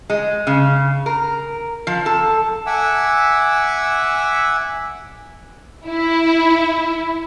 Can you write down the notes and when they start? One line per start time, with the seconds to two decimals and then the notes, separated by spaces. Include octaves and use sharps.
0.10 G#3
0.47 C#3
1.06 A#4
1.87 F3
2.06 A4
2.66 E5 F#5 G#5 D6 E6
5.88 E4